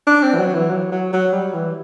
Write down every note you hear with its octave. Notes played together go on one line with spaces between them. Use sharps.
D4
C4
E3
F#3
E3
F#3
F#3
F#3
G3
E3